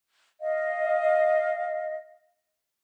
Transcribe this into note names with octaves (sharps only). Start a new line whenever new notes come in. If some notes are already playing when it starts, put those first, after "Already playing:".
D#5 F5